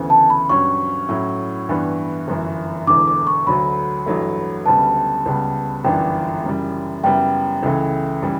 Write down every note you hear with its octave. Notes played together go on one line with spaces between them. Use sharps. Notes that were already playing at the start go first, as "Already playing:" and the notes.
Already playing: D2 C#3 E3 B3
A5
B5
G2 F#3 C#4 C#6
A2 F#3 C#4 E4
G2 E3 B3 D4
G1 F#2 E3
E1 E2 D3 D6
D6
C#6
D2 D3 F#3 B5
A1 G2 F#3 A3
D2 C#3 G3 B3 A5
C#2 C#3 G3 B3
G1 F#2 E3 B3 D4 G5
F#2 C#3 E3 G3
F#2 C#3 G3 B3 E4 G5
C#2 C#3 E3 A3
C#3 E3 G3